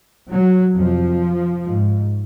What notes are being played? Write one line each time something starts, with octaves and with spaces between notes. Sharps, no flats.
F#3
F2 C3 F3
G#2